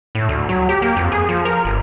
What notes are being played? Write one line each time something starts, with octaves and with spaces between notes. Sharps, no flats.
A2
D2
F#3
G4
A#3
F2
G#4
F3
A#4
G1